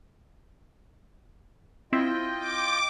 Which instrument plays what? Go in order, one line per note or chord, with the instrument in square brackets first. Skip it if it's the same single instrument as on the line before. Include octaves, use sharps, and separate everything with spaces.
[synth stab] C4 E4 [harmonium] F4 D#5 G5
[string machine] D6